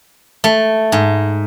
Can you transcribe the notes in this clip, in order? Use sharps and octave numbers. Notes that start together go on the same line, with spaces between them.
A3
G#2